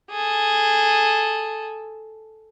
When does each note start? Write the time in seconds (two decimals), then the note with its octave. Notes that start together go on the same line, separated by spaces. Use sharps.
0.10 G#4 A4